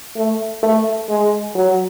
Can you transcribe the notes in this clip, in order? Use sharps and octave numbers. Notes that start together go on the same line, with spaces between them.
A3
A3
G#3
F#3